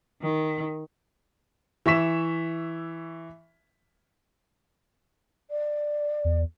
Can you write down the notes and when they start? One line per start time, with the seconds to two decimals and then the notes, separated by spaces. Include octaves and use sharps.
0.22 D#3
1.86 E3 E5 C#6 B6 E7
5.51 D5
6.25 E2